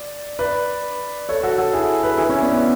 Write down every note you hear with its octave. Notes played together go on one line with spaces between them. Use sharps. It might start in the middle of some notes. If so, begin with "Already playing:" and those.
Already playing: D5
B4 D5
A4 C#5
F#4 A4
F#4 A4
E4 G#4
G#4 B4
E4 G#4
C#4 E4
B3 D4
B3